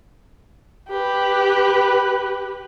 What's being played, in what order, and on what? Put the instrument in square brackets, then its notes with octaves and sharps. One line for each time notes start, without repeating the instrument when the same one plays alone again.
[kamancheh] G4 B4